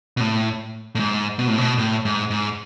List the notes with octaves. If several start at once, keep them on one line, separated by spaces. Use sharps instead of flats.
B2
A2
A2
G#2
B2
A2
B2
A2
G#2
G#2